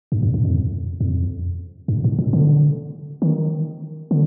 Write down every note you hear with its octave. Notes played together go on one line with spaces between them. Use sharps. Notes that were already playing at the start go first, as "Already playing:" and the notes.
G2
F2
G2
F2
F2
G2
G#2
A#2
D3
D#3
D3